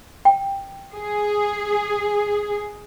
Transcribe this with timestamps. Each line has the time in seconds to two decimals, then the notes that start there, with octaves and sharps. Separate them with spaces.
0.25 G5
0.94 G#4